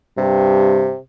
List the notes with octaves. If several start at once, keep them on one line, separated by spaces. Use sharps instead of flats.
G2 C3